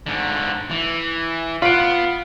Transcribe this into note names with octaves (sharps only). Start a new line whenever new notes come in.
G#2 D3
E3
F4 B4 F#5 D7